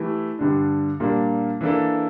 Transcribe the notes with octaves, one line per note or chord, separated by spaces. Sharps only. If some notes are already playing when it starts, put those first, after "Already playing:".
Already playing: E3 A3 E4 G4
G2 D3 G3 D4
A#2 G3 A#3 D4
E3 A#3 D4 A4